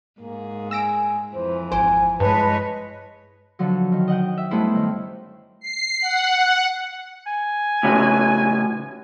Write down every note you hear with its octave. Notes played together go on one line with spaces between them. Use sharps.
G#2 A#3 G#4
G#5 E6 A#6 D7
F2 E3 C5
G#1 C5 G#5 D7
G2 G#3 E4 B4 C#5 D#5 A5
D3 F3 F#3
D#3
D#5 F#5 G5
E5
G2 A3 B3 C#4 E4 C5
D#3
C7
F#5
G#5
A2 C#3 F#4